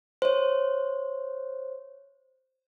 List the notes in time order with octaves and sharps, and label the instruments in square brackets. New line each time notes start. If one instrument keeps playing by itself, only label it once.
[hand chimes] C5 C#5